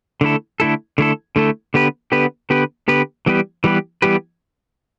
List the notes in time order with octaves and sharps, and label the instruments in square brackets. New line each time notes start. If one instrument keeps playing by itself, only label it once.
[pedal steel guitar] D3 A3 E4 A4
D3 A3 E4 A4
D3 A3 E4 A4
D3 A3 E4 A4
D3 B3 G4 B4
D3 B3 G4 B4
D3 B3 G4 B4
D3 B3 G4 B4
E3 G3 B3 G4 B4
E3 G3 B3 G4 B4
E3 G3 B3 G4 B4